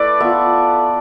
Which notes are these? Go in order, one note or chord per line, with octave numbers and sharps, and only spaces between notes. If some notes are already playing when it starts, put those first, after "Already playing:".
Already playing: A3 E4 A4 B4 D5
B3 F4 E5